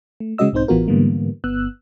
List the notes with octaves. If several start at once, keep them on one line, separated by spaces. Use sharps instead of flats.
A3
C#3 G#3 C#4 F#4 D#5 E6
B1 G#2 C4 D#4 C5 G6
A1 E3 B3 F4 F#4 A#4
G#2 D3 E3 G3 A#3 B3
G1 B3 E6 F#6